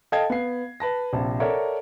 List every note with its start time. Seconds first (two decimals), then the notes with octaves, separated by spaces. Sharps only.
0.12 A4 D#5 F5 G5 A5 G#6
0.30 B3 F5 C7
0.80 B4 A5 A#6
1.13 A#1 C3 A5
1.40 A4 A#4 C#5 D5 E5 F#5